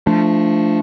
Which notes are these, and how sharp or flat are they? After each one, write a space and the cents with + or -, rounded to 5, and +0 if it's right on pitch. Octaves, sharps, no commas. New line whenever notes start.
F3 -20 A3 +0 D4 +0